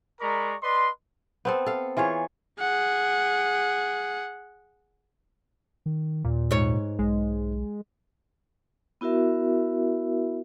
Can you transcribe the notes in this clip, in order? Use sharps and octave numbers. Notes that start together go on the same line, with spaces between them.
G#3 A#4 D5 A#5 B5 C#6
B4 D5 D#5 C6
B3 C4 A4
A4 F5
E3 F4 G#4 C#5
G#4 F#5
D#3
D#2 A#2
G#2 C#5
B1 G#3
B3 E4 F#4 A#4 E5